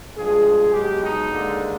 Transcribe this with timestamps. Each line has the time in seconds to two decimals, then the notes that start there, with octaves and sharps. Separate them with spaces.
0.17 G2 F3 G#3 G#4
0.74 B1 B2 G#3 G4
1.03 D#4
1.30 D#2 D3 G#3